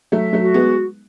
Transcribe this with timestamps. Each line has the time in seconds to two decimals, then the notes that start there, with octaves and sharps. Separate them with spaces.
0.12 F#3 A3 E5
0.33 F#3 A3
0.40 F#4
0.54 G#3 B3